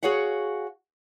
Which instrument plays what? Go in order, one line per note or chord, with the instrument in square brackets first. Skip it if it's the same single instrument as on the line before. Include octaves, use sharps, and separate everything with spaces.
[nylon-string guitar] F#4 G#4 C#5 F5 F#5